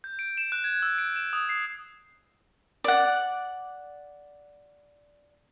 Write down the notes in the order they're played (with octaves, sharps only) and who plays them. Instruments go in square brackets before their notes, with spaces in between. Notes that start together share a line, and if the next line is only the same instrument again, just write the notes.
[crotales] G6
D7
E7
F#6
G#6
E6
D7
E7
D#6
C7
[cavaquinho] D5 F#5